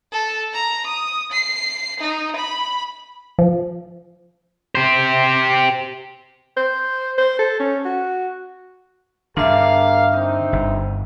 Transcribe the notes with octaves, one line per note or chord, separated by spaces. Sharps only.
A4
A#5
D#6
C7
D#4
B5
F3
G4 C5
C5
C5
A4
C#4
F#4
G2 D3 D4 G#4 A#4 E5 F5
C4 D#4
G1